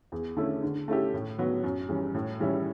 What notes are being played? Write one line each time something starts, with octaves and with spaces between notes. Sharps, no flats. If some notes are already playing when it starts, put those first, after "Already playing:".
E2
D3 A3 C#4 E4
D3
A3 C#4 E4 G4
A2
F#3 B3 F#4
F#2
E3 G3 C#4
A2
E3 G3 C#4 E4